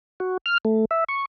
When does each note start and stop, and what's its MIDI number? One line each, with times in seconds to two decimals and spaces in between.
0.20 0.37 66
0.46 0.58 89
0.65 0.85 57
0.91 1.04 76
1.09 1.25 85